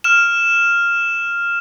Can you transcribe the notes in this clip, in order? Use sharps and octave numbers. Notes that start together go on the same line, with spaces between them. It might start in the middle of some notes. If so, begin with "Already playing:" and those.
F6 E7